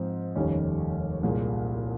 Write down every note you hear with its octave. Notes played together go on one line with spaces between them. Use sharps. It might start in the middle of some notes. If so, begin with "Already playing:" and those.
Already playing: G#2 F3 C4
F1 D#2 D#3 G3 C#4
C2 A#2 G#3